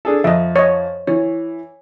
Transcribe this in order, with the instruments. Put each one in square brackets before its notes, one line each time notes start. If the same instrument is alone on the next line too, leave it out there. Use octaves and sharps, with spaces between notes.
[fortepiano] D4 G#4 A4
[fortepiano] F2 [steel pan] D#5 E5
[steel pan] C#5 D#5
[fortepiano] E3 [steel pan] C#5